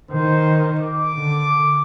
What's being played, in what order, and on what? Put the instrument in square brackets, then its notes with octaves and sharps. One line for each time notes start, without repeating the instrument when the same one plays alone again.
[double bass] D#3 [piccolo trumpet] C5
[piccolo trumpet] D6
[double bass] D3